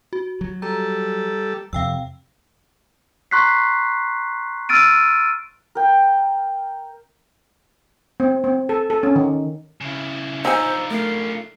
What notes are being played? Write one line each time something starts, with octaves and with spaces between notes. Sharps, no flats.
F#4
F#3
G3 A4 A#5
F2 C3 F5 G5 E6
A#5 C6 C#6 F#6 B6 C7
E6 F6 A6 D7 D#7
A#4 G5
C4
C4
A4
A4
C#4
D#3
C#3 E4
D4 D#4 F4 C5 G#5 A#5 E6
A3 A#4 C7